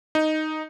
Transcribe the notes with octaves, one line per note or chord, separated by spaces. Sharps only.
D#4